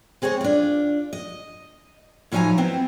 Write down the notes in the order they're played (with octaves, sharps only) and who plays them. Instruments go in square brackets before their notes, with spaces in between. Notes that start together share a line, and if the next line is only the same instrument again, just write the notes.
[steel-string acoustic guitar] G#3 C4 G#4 C5 C#5
D4 F4
D#5
A2 F3 F#3 D#4 G#5 A#5
B3 C4 E4